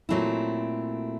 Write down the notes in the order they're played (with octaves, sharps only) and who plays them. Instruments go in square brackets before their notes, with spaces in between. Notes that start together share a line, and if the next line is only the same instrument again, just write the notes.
[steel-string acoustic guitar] A#2 F#3 A3 C4 E4